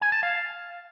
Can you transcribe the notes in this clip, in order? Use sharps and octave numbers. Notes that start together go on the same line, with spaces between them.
G#5
A5
F5